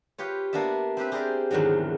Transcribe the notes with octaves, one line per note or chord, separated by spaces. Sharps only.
F4 G4 B4 C#5
A#3 B3 D4 D5 E5
C4 G4 B4 E5
G4 G#4 A#4 C5 D5 D#5
E2 G#2 D3 D#3 F#3